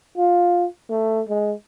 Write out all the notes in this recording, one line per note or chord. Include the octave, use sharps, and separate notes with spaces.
F4
A3
G#3